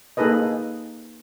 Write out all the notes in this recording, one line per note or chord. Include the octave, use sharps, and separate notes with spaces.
A#3 D#4 G#4 A4 B4 D#5